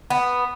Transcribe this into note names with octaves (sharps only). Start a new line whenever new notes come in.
B3